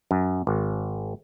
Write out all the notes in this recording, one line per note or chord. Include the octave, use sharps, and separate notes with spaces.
F#2
G#1